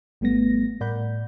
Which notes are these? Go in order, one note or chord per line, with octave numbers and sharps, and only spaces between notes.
G#1 G3 A3 B3 A#6
A2 A#4 D5 F#5 B5 G6